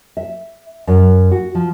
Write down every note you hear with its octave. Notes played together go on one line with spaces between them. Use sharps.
E5
F#2
F#4
F3